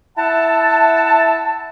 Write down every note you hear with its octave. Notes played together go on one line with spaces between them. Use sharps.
E4 E5 F#5 A5